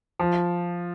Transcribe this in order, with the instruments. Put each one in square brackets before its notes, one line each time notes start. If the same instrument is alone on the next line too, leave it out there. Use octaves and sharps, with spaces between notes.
[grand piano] F3